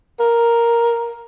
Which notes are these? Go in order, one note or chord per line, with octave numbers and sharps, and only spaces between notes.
A#4